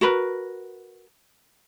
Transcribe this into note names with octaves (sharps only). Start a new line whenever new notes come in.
F#4 A#4 B4